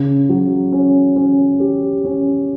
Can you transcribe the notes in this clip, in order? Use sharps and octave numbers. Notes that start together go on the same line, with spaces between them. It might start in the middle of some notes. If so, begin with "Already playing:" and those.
Already playing: C#3
F#3
C#4
C#4
G4
C#4